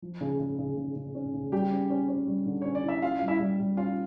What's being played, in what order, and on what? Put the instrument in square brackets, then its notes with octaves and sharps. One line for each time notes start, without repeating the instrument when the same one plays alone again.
[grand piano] F3
C#3
C#3
C#3
C#3
C#3
C#4
C#3
[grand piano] G3 [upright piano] G4 G5
[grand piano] C#4
C#4
C#4
G3
D3
[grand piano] C#4 [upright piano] C#5
[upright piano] D5
[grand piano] E4
[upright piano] E5
[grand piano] C#4 [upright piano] F4 F5
[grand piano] G3 [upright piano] F5
[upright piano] E4 E5
[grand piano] G3
G3
[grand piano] C#4 [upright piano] F4 F5